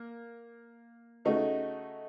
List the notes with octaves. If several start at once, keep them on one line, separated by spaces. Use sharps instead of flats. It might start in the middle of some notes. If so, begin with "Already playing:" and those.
Already playing: A#3
C#3 A3 D#4 F#4